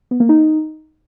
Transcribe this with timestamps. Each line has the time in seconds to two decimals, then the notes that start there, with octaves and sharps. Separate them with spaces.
0.11 B3
0.20 A#3
0.29 D#4